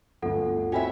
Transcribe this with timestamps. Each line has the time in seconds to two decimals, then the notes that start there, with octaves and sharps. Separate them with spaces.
0.22 G1 D2 F4 A4 F#5
0.72 C4 C#4 E4 F#4 E5 G5